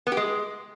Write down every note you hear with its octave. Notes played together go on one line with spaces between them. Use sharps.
B3
G4
G#3